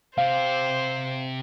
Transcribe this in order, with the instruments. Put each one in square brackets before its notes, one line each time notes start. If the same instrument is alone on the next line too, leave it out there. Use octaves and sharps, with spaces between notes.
[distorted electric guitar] C3 G4 [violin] C5 [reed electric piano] F5